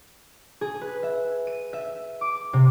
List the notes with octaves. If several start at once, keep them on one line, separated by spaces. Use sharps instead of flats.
G#4
B4
E5
D#7
E5
D6
C3